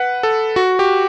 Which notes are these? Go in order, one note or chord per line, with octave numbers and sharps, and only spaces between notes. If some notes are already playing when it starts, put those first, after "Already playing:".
Already playing: B4 F#5
A4
F#4
G4